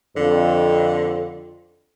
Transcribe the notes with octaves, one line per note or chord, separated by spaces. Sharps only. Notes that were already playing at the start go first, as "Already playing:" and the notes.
F2 D3